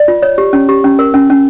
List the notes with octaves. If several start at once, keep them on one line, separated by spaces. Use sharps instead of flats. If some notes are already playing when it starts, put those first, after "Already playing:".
Already playing: D5
F4
C#5
G4
C#4
G4
C#4
A#4
C#4
C#4